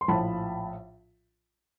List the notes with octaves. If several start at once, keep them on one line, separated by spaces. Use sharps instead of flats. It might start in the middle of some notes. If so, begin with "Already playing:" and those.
C6
A#1 A2 F3 A5 B5